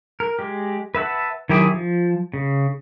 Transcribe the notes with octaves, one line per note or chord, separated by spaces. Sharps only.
A#4
G#3 G4
B4 E5 F#5 A5
D#3 F#3 E4 G4 G#4
F3
C#3